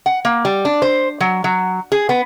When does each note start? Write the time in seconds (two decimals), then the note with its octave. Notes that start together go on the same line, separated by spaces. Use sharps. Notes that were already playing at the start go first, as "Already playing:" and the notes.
0.06 F#5
0.25 A#3
0.45 G3
0.65 D4
0.82 C5
1.20 F#3
1.44 F#3
1.92 G#4
2.09 B3